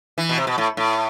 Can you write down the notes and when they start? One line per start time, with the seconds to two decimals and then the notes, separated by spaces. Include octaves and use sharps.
0.18 E3
0.29 B2
0.38 C3
0.47 B2
0.58 A2
0.77 A2